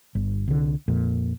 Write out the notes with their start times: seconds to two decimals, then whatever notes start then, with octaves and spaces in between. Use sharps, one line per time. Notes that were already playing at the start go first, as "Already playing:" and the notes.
0.15 G1
0.48 C2 D3
0.88 F2 A#2